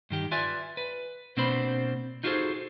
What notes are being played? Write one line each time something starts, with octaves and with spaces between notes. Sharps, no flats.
G2 D#3 G4
F4 B4 D5 E5 G#5
B4
B2 A#3 C4 D4 C5 B5
D#4 F4 F#4 G#4 A4 C5